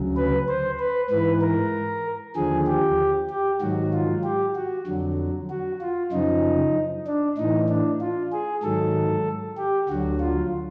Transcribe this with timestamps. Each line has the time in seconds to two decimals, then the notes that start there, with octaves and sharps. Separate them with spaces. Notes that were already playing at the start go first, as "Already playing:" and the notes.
Already playing: D2 C#3 F#3
0.16 B4
0.48 C5
0.79 B4
1.10 G#2 E3 B4
1.41 A#4
2.36 D#2 D3 F3 G#4
2.67 G4
3.30 G4
3.61 G#2 D#3 F#3 F#4
3.93 F4
4.24 G4
4.55 F#4
4.87 F2 D3 F#3
5.50 F#4
5.81 F4
6.12 F#2 C#3 F3 D#4
7.07 D4
7.37 A2 E3 D#4
7.69 D4
8.01 F4
8.32 G#4
8.63 G#2 D#3 F#3 A4
9.57 G4
9.89 D2 D3 F#3 F#4
10.20 F4